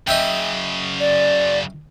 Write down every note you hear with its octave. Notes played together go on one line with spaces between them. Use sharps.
F#2 C#3 D#5 E5 G5
D5